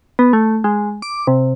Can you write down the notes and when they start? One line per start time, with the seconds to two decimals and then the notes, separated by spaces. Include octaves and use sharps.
0.19 B3
0.33 A3
0.64 G#3
1.02 D6
1.27 C3